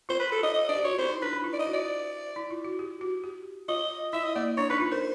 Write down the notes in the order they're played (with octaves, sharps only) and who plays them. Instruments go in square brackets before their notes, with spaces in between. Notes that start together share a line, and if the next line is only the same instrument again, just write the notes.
[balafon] F4 [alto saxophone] C5
[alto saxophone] B4
A4
D#5
D#5
D5
[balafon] G4
[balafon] F#4 [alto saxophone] C#5
[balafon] F4
[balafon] E4 [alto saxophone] C5
[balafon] D#4
[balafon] D4 [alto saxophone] B4
[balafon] E4
F4
[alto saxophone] D5
D#5
[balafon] F#4
[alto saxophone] D5
[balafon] E4
F4
F#4
G4
F#4
G4
[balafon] F4 [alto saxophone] D#5
[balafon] E4 [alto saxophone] E5
[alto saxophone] D#5
[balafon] A#3 [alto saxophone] D5
[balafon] D4 [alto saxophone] C#5
[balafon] D#4 [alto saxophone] B4
[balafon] F4
[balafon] A#4 [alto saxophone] C5